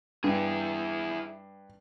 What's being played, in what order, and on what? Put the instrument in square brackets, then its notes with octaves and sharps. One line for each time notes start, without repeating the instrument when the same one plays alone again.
[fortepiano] G2 [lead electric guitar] E4 G#4